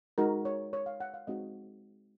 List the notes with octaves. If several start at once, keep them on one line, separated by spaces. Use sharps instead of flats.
G#3 D#4 F#4 A#4
C#5
C#5
F5
F#5
F5
G#3 C4 D#4 F#4 D#5